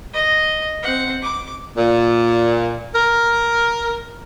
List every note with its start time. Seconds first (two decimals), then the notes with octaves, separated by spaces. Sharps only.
0.13 D#5
0.83 C4 F#5
1.22 D6
1.77 A#2
2.95 A#4